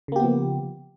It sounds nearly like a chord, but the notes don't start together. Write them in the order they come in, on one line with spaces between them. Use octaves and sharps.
C#3 A#3 G4 B3 F3